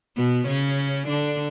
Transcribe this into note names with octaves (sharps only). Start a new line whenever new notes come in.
B2 B3
C#3 C#4
D3 D4